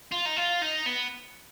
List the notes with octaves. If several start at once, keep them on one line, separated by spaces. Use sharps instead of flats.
F4
D#4
F4
D#4
B3